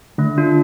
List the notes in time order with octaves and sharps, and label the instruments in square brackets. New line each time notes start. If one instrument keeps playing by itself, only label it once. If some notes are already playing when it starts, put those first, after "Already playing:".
[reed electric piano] D3 [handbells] A3
[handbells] D4 F4